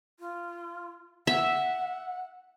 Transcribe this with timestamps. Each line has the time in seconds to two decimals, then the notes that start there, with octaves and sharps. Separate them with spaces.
0.20 F4
1.27 E5 F#5